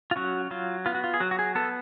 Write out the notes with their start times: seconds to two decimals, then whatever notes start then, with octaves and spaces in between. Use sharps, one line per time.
0.11 F4
0.16 F#3 C#4 F#4
0.51 F#3 F4
0.86 B3 F4
0.95 F#4
1.04 F4
1.14 G#4
1.20 F#3 F#4
1.31 F#4
1.39 G#4
1.55 B3 A4